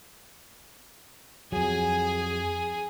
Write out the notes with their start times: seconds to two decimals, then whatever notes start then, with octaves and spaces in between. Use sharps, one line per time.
1.52 F2 F#3 G#4 G#5